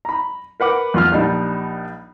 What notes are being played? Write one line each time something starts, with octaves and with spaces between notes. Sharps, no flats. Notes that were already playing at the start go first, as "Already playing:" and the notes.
A#5 B5
A#4 B4 F#5 D6
E2 F4 F6
A#1 G3 D4 D#4